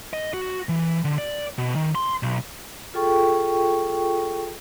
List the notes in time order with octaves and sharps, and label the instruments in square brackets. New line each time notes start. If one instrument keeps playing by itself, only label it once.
[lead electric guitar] D#5
F#4
E3
D3
D5
B2
D#3
C6
B1
[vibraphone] F4 G#4 A4 G5 C#6